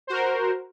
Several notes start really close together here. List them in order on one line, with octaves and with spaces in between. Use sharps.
C5 F#4 A#4